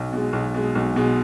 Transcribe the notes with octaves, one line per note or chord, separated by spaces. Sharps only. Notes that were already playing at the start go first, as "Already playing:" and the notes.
Already playing: B1
B2 G#3
B1
B2 G#3
B1
B2 G#3